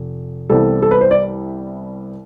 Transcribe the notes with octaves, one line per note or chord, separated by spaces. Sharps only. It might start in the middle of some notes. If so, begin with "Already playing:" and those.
Already playing: F1
C2 C3 E3 G3 B3 A4
A4
B4
C5
D5